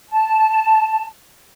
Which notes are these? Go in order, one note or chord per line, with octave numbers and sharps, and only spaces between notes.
A5